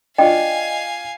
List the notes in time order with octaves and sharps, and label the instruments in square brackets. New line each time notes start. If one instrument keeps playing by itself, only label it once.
[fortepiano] D4 F4 [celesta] D#5 [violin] F5 G#5 [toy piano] G5 C#6